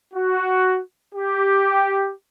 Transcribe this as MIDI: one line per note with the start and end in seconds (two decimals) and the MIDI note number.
0.14 0.80 66
1.14 2.11 67